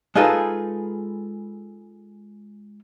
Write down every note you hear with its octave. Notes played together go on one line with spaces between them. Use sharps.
G#3 D#4 F4 G#4 A4 B4